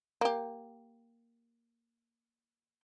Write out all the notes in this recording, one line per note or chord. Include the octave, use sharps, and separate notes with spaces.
A#3 G4